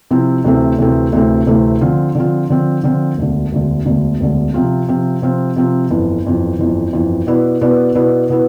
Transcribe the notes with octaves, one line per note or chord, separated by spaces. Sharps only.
C3 F3 C4 E4
D2 C3 E3 A3 C4
D2 C3 E3 A3 C4
D2 C3 E3 A3 C4
D2 C3 E3 A3 C4
D3 F3 C4 F4
D3 F3 C4 F4
D3 F3 C4 F4
D3 F3 C4 F4
E1 D2 D3
E1 D2 D3
E1 D2 D3
E1 D2 D3
C3 F3 C4 F4
C3 F3 C4 F4
C3 F3 C4 F4
C3 F3 C4 F4
G1 F2 E3
G1 F2 E3
G1 F2 E3
G1 F2 E3
B2 B3 E4 B4 D5
B2 B3 E4 B4 D5
B2 B3 E4 B4 D5
B2 B3 E4 B4